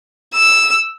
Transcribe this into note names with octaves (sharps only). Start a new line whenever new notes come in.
E6